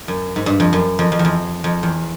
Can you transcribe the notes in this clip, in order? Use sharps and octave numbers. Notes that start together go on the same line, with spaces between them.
F#2
G#2
G2
F2
F#2
F2
F2
E2
F2
F2
E2